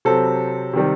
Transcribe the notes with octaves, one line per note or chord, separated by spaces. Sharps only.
C3 F#3 C4 A4
C3 D#3 G3